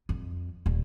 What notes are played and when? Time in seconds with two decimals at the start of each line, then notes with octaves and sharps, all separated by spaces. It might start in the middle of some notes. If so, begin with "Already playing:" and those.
0.09 F2
0.66 D#1